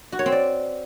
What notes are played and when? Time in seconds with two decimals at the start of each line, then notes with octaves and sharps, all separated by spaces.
0.12 F#4
0.19 C#5
0.26 C4
0.32 D5